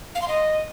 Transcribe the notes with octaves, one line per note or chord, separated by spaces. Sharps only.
F5
C6
D#5